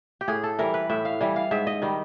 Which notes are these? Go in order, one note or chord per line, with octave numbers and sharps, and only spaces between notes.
G4
A2 G#4
A4
E3 G3 A#4
B4
A2 E5
F5
E3 G3
F5
G#2 E5
D#5
D#3 G3